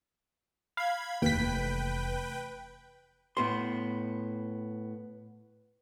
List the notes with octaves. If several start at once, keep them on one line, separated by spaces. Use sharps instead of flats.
F5 B5 G#6
F1 D#2 E3 B4 G5 B6
A2 B3 C6